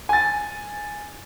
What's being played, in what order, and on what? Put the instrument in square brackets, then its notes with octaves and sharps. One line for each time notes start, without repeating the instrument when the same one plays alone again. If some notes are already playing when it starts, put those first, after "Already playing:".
[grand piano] G#5 A6